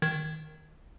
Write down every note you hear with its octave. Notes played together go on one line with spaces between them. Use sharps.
D#3 G#6